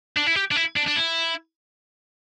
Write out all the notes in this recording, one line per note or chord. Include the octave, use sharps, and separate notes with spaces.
D4
E4
G4
D4
E4
D4
D4
E4